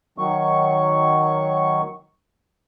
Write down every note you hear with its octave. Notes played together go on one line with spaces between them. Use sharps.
D#3 F#3 C#6